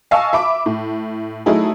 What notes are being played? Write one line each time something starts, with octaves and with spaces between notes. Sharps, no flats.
D#5 F5 G#5 A5 C#6 E6
E5 B5 D6
A2
F#3 A3 D#4 E4 G#4